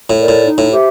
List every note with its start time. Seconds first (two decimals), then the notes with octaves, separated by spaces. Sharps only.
0.10 A2
0.19 A#4 D5
0.28 A2
0.45 D#4
0.58 A2
0.72 G4 C5 E5